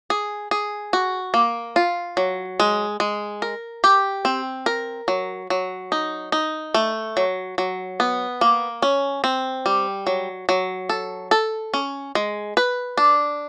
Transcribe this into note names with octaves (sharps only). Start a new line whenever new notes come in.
G#4
G#4
F#4
A#3
F4
F#3
G#3
G#3
A#4
G4
C4
A#4
F#3
F#3
D#4
D#4
A3
F#3
F#3
B3
A#3
C#4
C4
G3
F#3
F#3
A4
A4
C#4
G#3
B4
D4